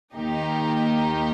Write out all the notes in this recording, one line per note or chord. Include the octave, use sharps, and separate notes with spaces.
D#2 D#3 A#3 D#4 G4